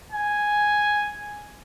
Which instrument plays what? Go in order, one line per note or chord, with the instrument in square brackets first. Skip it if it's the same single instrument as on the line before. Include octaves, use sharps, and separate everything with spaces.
[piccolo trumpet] G#5